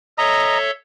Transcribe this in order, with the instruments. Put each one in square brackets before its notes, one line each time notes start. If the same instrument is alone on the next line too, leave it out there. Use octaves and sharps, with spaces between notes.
[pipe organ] A4 C#5 E5 [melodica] D#5 A#5